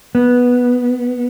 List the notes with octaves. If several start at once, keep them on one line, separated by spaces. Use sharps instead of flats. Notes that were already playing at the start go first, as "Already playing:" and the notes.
B3